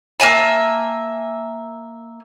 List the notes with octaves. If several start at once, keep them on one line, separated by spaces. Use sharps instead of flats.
A#3 E5 G#5 A5